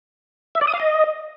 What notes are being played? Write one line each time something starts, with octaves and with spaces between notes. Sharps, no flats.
E5
D5
D#6
F5
D#5